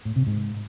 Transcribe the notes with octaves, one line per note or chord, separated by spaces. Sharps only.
A2
C3
G#2